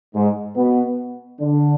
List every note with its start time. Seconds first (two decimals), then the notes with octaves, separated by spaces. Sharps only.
0.15 G#2 G#3
0.57 B2 B3
1.40 D3 D4